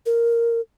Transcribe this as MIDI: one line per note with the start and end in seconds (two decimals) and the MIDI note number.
0.06 0.61 70